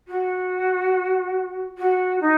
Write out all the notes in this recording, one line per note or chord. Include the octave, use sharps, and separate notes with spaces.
F#4
F#4
D#4